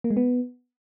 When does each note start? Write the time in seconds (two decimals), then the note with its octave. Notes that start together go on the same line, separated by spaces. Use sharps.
0.04 A#3
0.11 G#3
0.17 B3